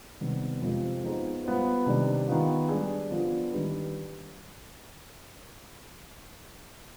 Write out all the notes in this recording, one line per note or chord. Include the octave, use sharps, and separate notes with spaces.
C3 D#3 G3 B3
F2 C3 F3 G#3 C4
F3 B3 D#4 G#4 C5
G3 B3 F4 C5
C3 D#3 G3 D4
D#3 B3 F4
G3 D4 G#4
D3 F3 B3 D4 F4
D#3 G3 D4 G4 B4